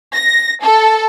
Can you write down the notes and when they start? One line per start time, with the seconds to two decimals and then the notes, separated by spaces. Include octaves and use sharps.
0.15 A#6
0.63 A4